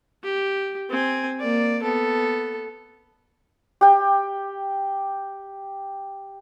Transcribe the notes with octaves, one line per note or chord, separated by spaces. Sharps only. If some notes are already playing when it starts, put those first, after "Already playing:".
G4
C4 G#5
A#3 D5
B3 A4
G4 G5